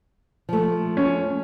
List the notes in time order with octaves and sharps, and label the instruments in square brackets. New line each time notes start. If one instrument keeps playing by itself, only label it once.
[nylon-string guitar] F3 A3
[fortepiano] C#4